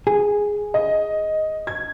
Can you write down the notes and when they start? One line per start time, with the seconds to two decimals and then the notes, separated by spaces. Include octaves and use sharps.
0.07 G#4
0.74 D#5
1.67 G#6